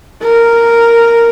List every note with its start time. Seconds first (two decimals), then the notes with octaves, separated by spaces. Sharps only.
0.22 A#4